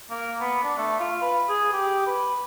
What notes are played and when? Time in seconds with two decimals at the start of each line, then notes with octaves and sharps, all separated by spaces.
0.10 A#3
0.40 B3
0.64 D4
0.78 A3
1.00 F4
1.22 B4
1.49 G#4
1.73 G4
2.07 B4